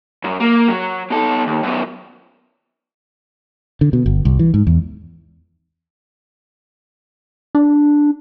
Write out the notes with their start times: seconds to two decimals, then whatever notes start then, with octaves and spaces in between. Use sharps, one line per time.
0.24 F#2
0.40 A#3
0.68 F#3
1.10 B2 A4
1.47 D#2
1.63 F#2 B3
3.81 D3
3.93 B2
4.06 G1
4.25 C2
4.39 E3
4.54 G#2
4.67 E2
7.55 D4